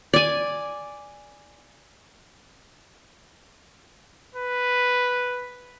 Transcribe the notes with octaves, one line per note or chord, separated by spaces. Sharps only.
D5 G#5
B4